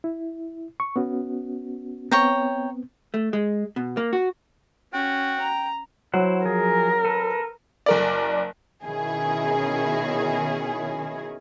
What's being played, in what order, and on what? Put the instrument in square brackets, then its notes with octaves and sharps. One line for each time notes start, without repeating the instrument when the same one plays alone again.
[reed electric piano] E4
C#6
B3 C#4 F#4
[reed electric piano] B3 C4 [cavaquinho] C#5 G5 A#5
[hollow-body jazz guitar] A3
G#3
B2
A#3
F#4
[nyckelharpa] C#4 [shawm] F#4 [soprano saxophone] G5
[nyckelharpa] A#5
[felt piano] F#3 [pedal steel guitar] E4 C5 F#5
[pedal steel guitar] F3 G#4 [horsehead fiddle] A#4
[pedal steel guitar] A4 B4
[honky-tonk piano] F#1 A#4 D5
[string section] B2 D#3 C#4 E4 G#4